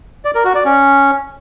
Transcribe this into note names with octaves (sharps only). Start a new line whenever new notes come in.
D5
A#4
F#4
D5
C#4